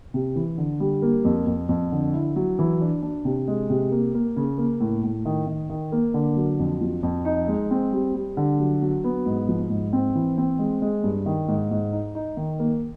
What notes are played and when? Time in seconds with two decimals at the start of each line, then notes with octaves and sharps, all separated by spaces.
0.14 C3
0.36 E3
0.58 D3
0.80 G3
1.02 A#3
1.25 F2
1.46 F2
1.69 F2
1.92 D3
2.13 E4
2.36 F#3
2.59 E3
2.81 D4
3.03 D4
3.25 C3
3.48 G#3
3.70 C3
3.91 A#3
4.15 A#3
4.36 C#3
4.58 A#3
4.80 A2
5.04 A2
5.25 D#3
5.47 D#3
5.69 D#3
5.92 A#3
6.14 D3
6.36 F#3
6.59 F2
6.81 F3
7.03 F2
7.25 D#4
7.48 G#3
7.71 C4
7.92 G3
8.14 G3
8.37 D3
8.59 F#3
8.82 F#3
9.04 B3
9.26 G#2
9.49 F3
9.70 G#2
9.93 C4
10.15 E3
10.38 C4
10.59 G#3
10.82 G#3
11.04 G2
11.26 D#3
11.48 G#2
11.71 G#2
11.93 D#4
12.15 D#4
12.37 D#3
12.59 A#3